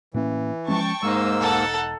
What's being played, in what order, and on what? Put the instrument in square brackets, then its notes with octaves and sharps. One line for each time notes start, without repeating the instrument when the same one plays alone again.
[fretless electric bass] A2 A#3 C#4 [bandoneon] E3
[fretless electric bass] F3 G#3 C#4 [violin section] G5 A5 C#6
[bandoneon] G#2 A#3 E6 [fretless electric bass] G#3 [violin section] D#4 C5
[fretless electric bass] E1 [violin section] D#4 A4 F#5